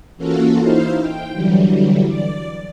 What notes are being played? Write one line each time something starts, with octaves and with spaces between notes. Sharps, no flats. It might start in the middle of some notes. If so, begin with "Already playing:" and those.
E3 A#3 C#4 F4 F#4 A4
D#4 E4 C5 F5
G5
D3 E3 F#3 G3
D5